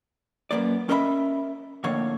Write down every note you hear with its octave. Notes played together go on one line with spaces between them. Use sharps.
F#2 C3 A#3 B3 D5
C#4 A#4 D#5 E5 F#5 B5
F2 A2 D3 A#3 C#5